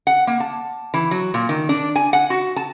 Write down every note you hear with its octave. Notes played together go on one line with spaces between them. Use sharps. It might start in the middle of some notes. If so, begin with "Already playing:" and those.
F#5
A#3
A5
E3
F#3
A#2
D#3
D4
G#5
F#5
F#4
A5